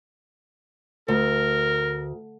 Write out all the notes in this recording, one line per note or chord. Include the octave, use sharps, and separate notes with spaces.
D2 A#4